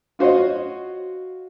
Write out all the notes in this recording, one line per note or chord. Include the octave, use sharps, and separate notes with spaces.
F4 F#4 C5 C#5 D#5